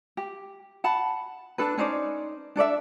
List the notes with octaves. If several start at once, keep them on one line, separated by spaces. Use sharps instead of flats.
G4
F#5 A5 B5
D4 A4 B4
C#4 D#4 C5 D5
D4 A4 D5 E5